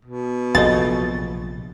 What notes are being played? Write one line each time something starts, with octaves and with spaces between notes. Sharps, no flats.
B2
A#1 C3 F#3 G#3 A3 D#5 A6